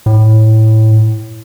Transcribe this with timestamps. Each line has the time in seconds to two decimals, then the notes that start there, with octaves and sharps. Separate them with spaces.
0.06 A2